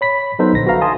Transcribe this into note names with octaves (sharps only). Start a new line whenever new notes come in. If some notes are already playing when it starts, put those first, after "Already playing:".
C#5 B5 B6
F#3 B3 D#4 A4 B4 C5
A#1 D3 A#6
F#4 A4 B4 E5 F5 A#5
G#5 A5 C6 D#6